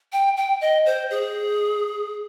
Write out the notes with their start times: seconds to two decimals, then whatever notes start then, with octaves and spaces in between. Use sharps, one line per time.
0.13 G5
0.37 G5
0.61 D#5
0.86 C5
1.10 G#4